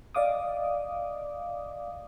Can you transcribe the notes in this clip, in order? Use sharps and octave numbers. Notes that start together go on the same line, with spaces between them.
D5 D#5 F5 D6 D#6